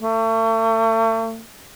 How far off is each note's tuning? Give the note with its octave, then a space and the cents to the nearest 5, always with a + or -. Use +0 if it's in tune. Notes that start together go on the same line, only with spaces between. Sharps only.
A3 +40